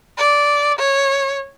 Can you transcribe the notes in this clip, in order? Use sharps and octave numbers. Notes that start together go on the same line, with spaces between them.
D5
C#5